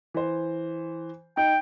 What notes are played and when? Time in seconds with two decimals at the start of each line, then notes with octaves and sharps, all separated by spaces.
0.14 E3 C5
1.37 D#4 G5